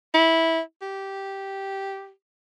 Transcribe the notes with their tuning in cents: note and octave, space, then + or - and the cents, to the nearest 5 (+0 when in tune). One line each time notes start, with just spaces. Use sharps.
E4 -15
G4 -10